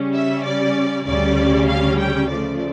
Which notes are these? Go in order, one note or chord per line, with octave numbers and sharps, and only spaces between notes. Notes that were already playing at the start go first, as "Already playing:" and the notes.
Already playing: C#3 G3 C#4
E5
D5
D2 C#3 G3 C#4 D5
F5
G5
C#3 F3 A3 D5